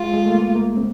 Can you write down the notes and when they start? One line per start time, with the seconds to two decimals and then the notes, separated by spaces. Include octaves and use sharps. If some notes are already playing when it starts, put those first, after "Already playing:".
Already playing: G#3 F4
0.13 G#3
0.26 A3
0.35 A#3
0.56 A#3
0.77 C4